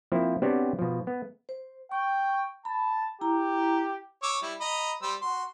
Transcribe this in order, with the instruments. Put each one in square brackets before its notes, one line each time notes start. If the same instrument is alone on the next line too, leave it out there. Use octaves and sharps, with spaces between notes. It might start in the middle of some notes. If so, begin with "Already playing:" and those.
[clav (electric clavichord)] F3 A#3 C4 E4
B3 C4 D4 F#4 G4 C#5
B2 F3
B3
[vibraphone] C5
[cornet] G5 [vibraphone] C#6
[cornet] A5 [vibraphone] B5
[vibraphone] E4 A#5 [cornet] G4
[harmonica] C#5 D6 E6
G3 E4
D#5 A#5 B5
G3 C5 E6
F#4 C6